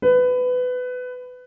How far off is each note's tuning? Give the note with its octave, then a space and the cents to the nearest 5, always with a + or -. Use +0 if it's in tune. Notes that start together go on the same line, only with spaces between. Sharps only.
B4 +20